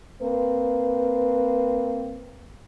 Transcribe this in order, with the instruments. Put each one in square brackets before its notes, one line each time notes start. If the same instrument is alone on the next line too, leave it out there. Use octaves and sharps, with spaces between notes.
[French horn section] A#3 C4 B4